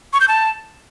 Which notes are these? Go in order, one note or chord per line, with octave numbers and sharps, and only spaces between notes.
C#6
G6
A5